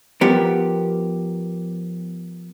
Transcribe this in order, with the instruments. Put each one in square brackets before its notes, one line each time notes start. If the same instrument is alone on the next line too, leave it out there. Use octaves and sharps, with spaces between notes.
[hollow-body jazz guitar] F3 B3 G4 A#4